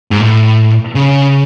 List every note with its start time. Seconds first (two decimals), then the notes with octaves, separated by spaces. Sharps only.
0.11 G#2
0.21 A2
0.95 C#3